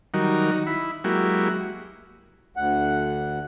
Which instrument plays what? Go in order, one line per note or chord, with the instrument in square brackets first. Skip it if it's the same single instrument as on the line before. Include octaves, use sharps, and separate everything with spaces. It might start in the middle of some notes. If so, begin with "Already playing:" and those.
[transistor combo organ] D#3 F#3 G3 D#4 F#4 A#4
D#4
E4 B5
F#3 G#3 A#3 E4 F#4 G4
[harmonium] D2 F#5